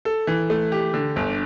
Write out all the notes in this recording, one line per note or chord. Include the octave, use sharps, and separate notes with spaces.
A4
E3
A3
G4
D3
G1